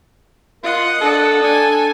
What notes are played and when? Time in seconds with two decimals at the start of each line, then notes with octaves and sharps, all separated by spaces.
0.64 F4 A#4 D#5 F#5
1.01 D4 A4
1.43 D4 G#5